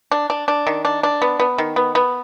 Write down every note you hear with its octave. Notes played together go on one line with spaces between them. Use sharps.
D4
D4
D4
D#3
D4
D4
B3
B3
D#3
B3
B3